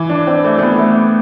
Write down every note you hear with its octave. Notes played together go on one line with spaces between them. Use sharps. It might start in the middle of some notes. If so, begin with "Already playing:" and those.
Already playing: E3
D4
C4
A3
A3
B3
A3